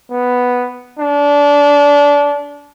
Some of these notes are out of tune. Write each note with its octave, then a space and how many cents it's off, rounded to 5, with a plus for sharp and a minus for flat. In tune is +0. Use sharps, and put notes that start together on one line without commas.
B3 +0
D4 -25